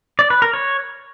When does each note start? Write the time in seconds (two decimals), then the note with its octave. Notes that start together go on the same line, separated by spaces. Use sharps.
0.19 D5
0.30 B4
0.42 A#4
0.54 C#5